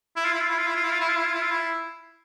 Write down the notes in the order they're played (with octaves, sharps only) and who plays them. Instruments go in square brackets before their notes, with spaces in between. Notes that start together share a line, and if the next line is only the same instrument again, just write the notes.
[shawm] E4
F4
E4
F4
E4
F4
E4
F4
E4
F4
E4
F4
E4
F4
E4
F4
E4